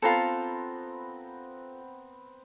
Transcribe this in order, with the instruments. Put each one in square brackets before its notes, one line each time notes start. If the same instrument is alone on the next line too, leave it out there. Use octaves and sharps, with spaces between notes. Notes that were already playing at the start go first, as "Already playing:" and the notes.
[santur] B3 C4 A#5 [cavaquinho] F4 A4